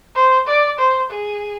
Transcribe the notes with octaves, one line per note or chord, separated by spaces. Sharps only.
C5
D5
C5
G#4